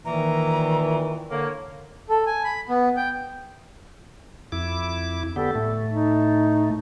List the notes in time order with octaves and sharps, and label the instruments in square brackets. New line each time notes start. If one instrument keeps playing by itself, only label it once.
[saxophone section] A#2 E3 [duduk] D#3 [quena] A#5
[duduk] D3 [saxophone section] A#3 [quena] C#5
[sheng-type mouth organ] A4
G#5
B5
B3
G5
[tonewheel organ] F2 E4 D6
[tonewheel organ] D3 B3 G4 [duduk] A4
[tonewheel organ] A2 A3
[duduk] D#4